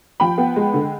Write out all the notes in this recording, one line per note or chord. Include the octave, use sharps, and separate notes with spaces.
F3 G5 B5
B3
G#3
D3